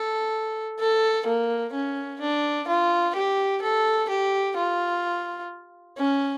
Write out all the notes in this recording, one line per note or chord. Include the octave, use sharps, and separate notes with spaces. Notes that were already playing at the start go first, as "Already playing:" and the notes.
Already playing: A4
A4
A#3
C#4
D4
F4
G4
A4
G4
F4
C#4